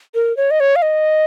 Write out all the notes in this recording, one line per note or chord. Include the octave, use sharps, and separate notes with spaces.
A#4
C#5
D#5
C#5
F5
D#5